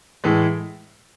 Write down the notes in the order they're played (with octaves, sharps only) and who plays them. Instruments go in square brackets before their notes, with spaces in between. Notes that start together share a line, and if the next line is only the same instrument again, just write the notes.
[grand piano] A2 E3 G#3